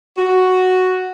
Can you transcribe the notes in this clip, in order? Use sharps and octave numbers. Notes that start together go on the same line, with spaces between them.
F#4